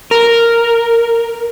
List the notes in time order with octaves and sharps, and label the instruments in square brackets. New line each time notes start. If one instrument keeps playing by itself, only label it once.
[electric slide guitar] A#4